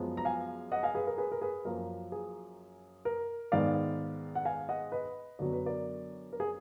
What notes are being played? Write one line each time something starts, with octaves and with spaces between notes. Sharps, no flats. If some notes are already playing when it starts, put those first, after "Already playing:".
Already playing: F#2 F3 G#3 B3
A#5
F5 G#5
D#5 F#5
F5 G#5
G#4 B4
A#4
G#4 B4
A#4
G#4 B4
F#2 F3 A#3 A#4
G#4
A#4
G#2 D#3 G#3 B3 D5 F5
F#5
F5 G#5
D#5 F#5
B4 D#5
F#2 D3 F#3 B3 D5
B4
A#4 D5
A#4
G#4